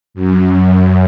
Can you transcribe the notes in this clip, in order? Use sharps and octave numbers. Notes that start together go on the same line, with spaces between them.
F#2